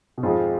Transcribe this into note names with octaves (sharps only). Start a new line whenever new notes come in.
B2
F2 G#2 F3 G#3 C4 F4